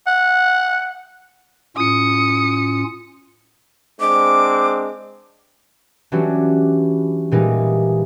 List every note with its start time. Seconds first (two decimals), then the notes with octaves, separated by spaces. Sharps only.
0.07 F#5
1.77 A2 C#4 F4 D#6 C#7
4.00 G#3 C4 D4 D6
6.12 E3 F#3 G3 C#4 D4 F#4
7.31 A#2 E3 G3 G#3 D#4